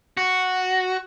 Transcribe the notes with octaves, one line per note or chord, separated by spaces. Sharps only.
F#4